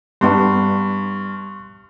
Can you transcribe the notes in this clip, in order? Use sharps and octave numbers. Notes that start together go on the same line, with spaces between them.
G2 G3 B3 D4 C6 C#6